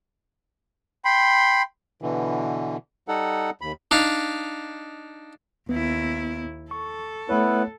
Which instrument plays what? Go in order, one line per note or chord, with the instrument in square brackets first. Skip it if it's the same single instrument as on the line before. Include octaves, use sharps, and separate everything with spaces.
[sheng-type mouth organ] G5 B5 C6
[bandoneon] B2 D3 E3
G3 D#4 A4 F#5
D#2 B5
[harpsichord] D4 D#4 F5
[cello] D#2 E4 [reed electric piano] B3
[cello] A4 [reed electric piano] C#6
[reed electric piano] A3 C#5 [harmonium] B3 E4 B4